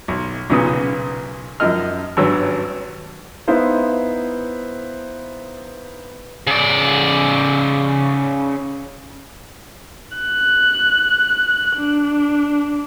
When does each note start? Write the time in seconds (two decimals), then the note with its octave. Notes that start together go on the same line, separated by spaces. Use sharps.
0.08 B1
0.50 B1 A#2 C#3 B3 D#6
1.60 F#2 F3 D#5 F6
2.17 G#1 G2 F#3 B3 C#4 E6
3.47 B3 D#4 E4 C5 F5
6.47 C#3 D5
10.17 F#6
11.77 D4